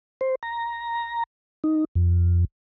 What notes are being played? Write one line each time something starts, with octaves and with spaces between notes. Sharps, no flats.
C5
A#5
D#4
F2